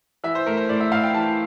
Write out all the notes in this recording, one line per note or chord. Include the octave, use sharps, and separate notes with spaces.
E3 E5
C5
A3 A#4
C5
A2 D5
E5
A2 F5
G5
E3 A5